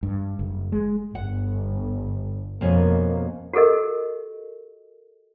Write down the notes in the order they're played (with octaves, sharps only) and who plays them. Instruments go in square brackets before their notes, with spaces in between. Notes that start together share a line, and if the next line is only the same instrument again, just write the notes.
[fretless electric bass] G2
F#1
G#3
[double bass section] G1 [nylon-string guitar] F#5
[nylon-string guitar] F2 B2 C#4 [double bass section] A#3
[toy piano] F#4 G4 A4 A#4 D#5